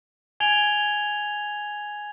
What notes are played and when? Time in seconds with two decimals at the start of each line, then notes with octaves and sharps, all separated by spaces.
0.40 G#5 G#6 F7 G7